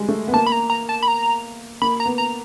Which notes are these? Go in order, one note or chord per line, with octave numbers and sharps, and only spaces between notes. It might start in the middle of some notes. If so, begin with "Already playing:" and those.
Already playing: G3 G#3
A3
B3
A#3 A5
B5
A#5
A#5
A5
B5
A#5
A#3 B5
A#5
B3
A#5